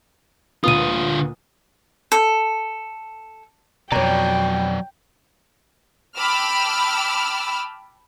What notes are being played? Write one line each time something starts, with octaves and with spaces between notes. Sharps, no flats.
D2 A#2 D3 F4 B4 D#6 D#7
A4
F2 B2 F#3 C#5 D5 G5 A#5
G5 A5 B5 D6 E6 F6